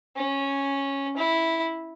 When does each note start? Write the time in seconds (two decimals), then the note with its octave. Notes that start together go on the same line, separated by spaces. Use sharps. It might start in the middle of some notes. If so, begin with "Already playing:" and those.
0.17 C#4
1.17 E4